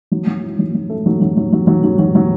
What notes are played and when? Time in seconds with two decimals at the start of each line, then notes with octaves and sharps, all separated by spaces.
0.12 F#3
0.27 F#3
0.44 E4
0.59 F#3
0.74 F#3
0.90 A3
1.06 F#3
1.21 F#3
1.37 F#3
1.53 F#3
1.67 F#3
1.84 F#3
1.99 F#3
2.15 F#3